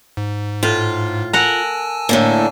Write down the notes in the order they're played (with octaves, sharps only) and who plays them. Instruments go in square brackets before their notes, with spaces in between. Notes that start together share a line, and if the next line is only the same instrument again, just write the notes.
[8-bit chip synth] G#2
[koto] A2 [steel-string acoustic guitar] F4
[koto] A#4 F#5 [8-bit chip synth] G#5 A5 E6
[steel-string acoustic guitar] A2 D3 A#3